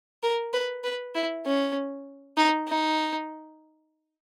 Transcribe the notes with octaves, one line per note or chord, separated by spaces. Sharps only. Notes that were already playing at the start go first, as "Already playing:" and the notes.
A#4
B4
B4
E4
C#4
D#4
D#4